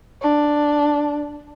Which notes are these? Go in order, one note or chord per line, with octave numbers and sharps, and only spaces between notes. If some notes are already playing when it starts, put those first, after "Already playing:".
D4